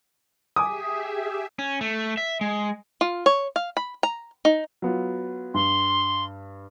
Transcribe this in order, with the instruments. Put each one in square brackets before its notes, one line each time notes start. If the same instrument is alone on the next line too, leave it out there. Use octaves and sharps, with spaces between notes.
[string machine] G4 G#4 E5 [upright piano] G#5 D6 D#6
[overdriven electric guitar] C#4
A3
E5
G#3
[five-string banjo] F4
C#5
F5
B5
A#5
D#4
[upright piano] F#3 B3 F4
[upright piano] G2 [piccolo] C6